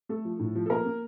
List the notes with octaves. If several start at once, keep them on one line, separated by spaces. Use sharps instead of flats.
A3 A4
F3
A2
F3
A4
A#3 A#4
A#3